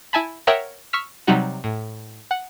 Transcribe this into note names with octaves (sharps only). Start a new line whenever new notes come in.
E4 E5 G#5 A5 B5
A#4 C#5 E5 F#5 G5 D#6
C#6 E6 F6 B6
C3 F#3 G3 D#4 F#4
A2
F#5